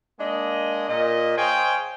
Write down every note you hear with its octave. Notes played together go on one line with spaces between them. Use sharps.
G#3 A#3 D4 D#5
A#2 D#5
G#4 C5 C#5 D#5 F5 G5